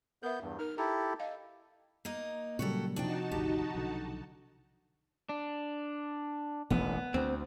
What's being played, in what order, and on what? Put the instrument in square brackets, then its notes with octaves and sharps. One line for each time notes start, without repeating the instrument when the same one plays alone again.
[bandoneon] B3 G6 [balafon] A#4 E5
[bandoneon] E2 G2
[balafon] D#4 A#4 [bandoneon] F6
[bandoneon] E4 G4 A4 [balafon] A#5
[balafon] D#5 F5
[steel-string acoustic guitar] A#3 D#4 D#5
[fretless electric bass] A#2 A#3 [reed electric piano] C#3 F#3 G3 [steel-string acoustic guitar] F#4 G4 A4
[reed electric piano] C3 F3 [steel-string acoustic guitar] D4 D5 G5 [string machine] D#4 F#4 A5
[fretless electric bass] G#1 D2 [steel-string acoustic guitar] G4
[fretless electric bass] B1 D3
[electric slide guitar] D4
[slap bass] E1 A1 D#2 [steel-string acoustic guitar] B3
[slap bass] D2 [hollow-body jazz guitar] C4